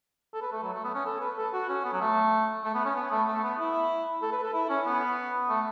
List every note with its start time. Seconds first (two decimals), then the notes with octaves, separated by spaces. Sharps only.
0.34 A4
0.42 B4
0.53 A3
0.63 F#3
0.74 A3
0.84 B3
0.94 C#4
1.05 A4
1.21 B4
1.37 A4
1.53 F#4
1.69 C#4
1.84 B3
1.93 F#3
2.01 A3
2.64 A3
2.75 B3
2.85 C#4
2.95 B3
3.11 A3
3.28 A3
3.43 B3
3.59 E4
4.22 A4
4.32 B4
4.43 A4
4.53 E4
4.69 C#4
4.86 B3
5.49 A3